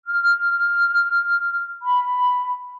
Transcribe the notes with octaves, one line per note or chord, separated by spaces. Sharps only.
F6
B5